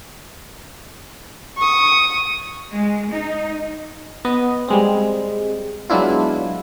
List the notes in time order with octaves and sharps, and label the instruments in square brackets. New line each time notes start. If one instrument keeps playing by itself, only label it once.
[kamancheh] C#6 D#6
[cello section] G#3
D#4
[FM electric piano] B3 D#5
G3 G#3 C4
F#3 G#3 B3 D4 E4 F4